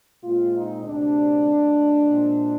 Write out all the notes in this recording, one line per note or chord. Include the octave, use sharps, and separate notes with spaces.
A#2 G#3 C4 F4
D#4
D2 C3 G3 C4 D4
D2 D3 G#3
A#2 G#3 C4